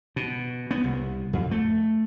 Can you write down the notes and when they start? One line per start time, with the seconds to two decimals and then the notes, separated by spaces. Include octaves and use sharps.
0.16 B2
0.71 B3
0.84 C2
1.33 F2
1.51 A3